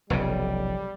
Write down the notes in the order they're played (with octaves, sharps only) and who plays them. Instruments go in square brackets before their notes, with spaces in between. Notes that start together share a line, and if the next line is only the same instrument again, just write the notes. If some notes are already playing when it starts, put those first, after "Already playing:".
[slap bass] F1 B1 C#3 [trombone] G3